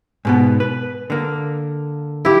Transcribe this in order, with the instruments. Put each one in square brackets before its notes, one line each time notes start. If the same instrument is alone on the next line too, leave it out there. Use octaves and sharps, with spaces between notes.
[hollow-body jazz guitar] G#2 B2 B3
B4
D3 A#3
[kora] E4 G4